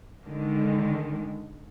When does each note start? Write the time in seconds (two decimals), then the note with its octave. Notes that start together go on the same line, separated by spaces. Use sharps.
0.25 D3 D#3 G#3